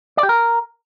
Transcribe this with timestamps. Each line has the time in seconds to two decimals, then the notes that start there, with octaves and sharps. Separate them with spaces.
0.17 D5
0.23 G4
0.29 A#4